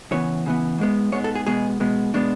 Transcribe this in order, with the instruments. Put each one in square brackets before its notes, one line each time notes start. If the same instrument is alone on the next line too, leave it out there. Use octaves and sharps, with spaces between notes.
[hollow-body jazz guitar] C#3 E3 B3 C#5
C#3 E3 B3
G#2 G#3 B3
G#2 G#3 B3 C#5
A4
G#4
B2 G#3 B3 G#4
B2 G#3 B3
B2 G#3 B3 D4